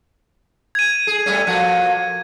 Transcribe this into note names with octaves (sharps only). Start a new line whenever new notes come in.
G#6 D#7
G#4
G3 A3 C#4
A#2 F3 F#4